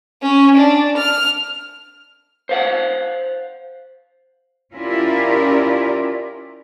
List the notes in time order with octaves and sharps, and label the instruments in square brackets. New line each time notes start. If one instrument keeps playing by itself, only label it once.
[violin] C#4
D4
F6
[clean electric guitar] C5 F5 F#5
[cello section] C#4 E4 F4 G4 A#4 D5